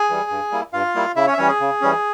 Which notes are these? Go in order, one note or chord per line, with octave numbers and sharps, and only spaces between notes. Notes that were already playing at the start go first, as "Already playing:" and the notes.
Already playing: G#4 G#5
E3 G3
G2
G3 A#3 E4
G2 F4 F5
G3 A#3 E4
C#3 E4 E5
C#4 C#5
E5
E3 G3 C#4 C#5
G#4
C#3
E3 G3 C#4